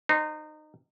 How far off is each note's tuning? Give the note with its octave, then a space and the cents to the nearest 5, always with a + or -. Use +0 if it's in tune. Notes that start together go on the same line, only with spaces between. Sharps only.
D#4 -25 C5 +0